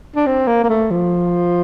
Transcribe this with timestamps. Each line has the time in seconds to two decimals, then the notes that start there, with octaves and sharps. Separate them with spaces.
0.16 D4
0.26 C4
0.47 A#3
0.64 A#3
0.69 A3
0.91 F3